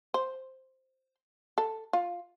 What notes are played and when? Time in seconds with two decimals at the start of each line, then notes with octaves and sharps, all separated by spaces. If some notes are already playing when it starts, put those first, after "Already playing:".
0.14 C5
1.58 A4
1.93 F4